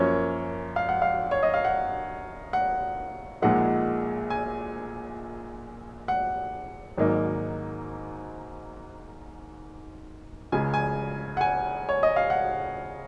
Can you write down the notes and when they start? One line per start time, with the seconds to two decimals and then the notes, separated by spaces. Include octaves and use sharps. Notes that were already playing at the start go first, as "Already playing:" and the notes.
Already playing: F#2 F3 A#3 C#4 C#5
0.76 F5
0.89 F#5
1.02 F5
1.31 C#5
1.43 D#5
1.54 F5
1.64 F#5
2.53 F#5
3.42 A#1 A#2 G#3 D#4 F#5
4.30 G#5
6.08 F#5
6.98 G#1 G#2 F#3 A#3 D#4
10.52 C#2 C#3 G#3 G#5
10.74 G#5
11.37 F#5
11.41 G#5
11.89 C#5
12.03 D#5
12.16 F5
12.30 F#5